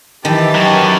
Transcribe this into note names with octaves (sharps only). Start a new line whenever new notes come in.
D#3 E3 G4 A5
F#2 F#3